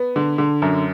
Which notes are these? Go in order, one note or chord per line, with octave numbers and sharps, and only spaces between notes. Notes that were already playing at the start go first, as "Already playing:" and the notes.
Already playing: B3
D3
D3
F#2